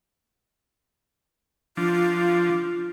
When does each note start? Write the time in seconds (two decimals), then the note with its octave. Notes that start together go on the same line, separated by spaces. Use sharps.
1.77 F3 D4 F4